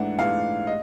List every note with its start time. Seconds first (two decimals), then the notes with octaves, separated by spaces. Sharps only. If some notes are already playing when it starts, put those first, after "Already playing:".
Already playing: G#2 E3 A3 D4 F#5
0.18 G#2 E3 A3 D4 F5
0.67 D#5